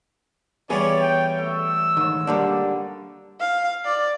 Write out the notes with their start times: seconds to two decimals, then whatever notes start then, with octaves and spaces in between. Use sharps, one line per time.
0.70 E3 G3 B3 C#4 G#4 C#5 D5 C#6
1.00 G5
1.38 A3 E6
1.97 G#2 D#3
2.27 D3 G3 A#3 D4
3.40 F5
3.85 D5